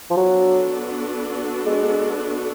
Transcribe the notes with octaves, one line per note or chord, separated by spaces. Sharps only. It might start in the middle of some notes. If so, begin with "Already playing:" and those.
F3
F#3 B3 D4 F#4 A4
G#3